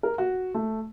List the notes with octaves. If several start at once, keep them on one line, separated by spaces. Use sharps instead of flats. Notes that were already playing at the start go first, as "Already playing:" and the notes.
A#4
F#4
A3